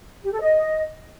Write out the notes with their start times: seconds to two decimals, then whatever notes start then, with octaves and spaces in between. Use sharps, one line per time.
0.23 G4
0.32 A4
0.41 D#5